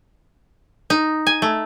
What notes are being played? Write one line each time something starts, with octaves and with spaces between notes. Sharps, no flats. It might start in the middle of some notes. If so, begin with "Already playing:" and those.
D#4
G#5
A3